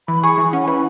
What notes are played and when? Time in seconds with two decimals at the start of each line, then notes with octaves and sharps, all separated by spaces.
0.08 E3 B5
0.23 G#4 C#6
0.38 E3
0.53 C#4 F#5
0.63 G#5
0.67 E3 B5